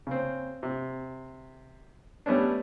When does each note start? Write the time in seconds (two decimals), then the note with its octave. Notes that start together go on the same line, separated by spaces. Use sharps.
0.07 C#3 C4
0.63 C3
2.26 G3 A3 B3 C#4 D4